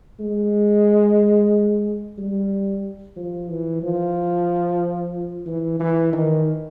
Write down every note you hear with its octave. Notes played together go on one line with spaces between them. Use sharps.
G#3
G3
F3
E3
F3
E3
E3
D#3